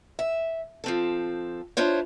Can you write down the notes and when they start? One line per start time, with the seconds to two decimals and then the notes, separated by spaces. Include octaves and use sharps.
0.19 E5
0.84 F3 C4 A4
1.77 D4 E4 F4 C5 C#5